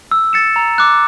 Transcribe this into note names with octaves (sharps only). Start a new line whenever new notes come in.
E6
A6 C#7 E7
A#5
D6 F#6